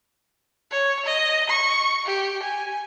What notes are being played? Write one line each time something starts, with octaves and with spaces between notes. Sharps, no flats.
C#5
D#5
C#6
G4
G#5